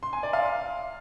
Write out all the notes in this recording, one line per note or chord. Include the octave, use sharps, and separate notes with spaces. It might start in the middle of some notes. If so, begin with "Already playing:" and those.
C6
G#5
D5
F5